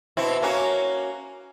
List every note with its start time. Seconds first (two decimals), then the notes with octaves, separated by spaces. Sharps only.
0.17 B2 C4 E4
0.42 A#3 C#4 F#4